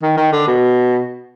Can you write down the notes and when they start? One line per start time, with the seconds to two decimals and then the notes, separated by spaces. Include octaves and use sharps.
0.03 D#3
0.17 D#3
0.32 D3
0.47 B2